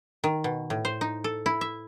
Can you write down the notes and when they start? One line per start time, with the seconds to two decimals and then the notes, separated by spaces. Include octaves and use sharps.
0.24 D#3
0.44 B2
0.70 A2
0.85 C5
1.01 D#4
1.24 A4
1.46 E4
1.61 E5